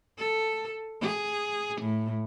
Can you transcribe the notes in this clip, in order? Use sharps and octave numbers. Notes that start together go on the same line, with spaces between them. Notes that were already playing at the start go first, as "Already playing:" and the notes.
A4
G#4
A2